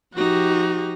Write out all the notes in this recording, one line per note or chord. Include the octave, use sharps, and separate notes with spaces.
F3 D#4 F#4 G4